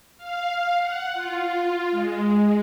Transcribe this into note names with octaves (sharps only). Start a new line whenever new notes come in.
F5
F#5
F4
G#3